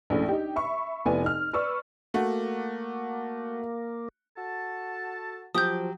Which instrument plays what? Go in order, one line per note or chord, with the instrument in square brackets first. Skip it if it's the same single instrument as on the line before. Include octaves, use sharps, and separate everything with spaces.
[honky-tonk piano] A#1 A2 C#4
D#4 G4
E5 B5 C#6
F1 B3 E4 D5 G#5
D#4 F6
B4 D5 C#6 E6
[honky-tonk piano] A3 F#4 [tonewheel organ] A#3
[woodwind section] F#4 A4 A5
[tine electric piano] F3 [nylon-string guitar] F#3 G4 [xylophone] D#6 G6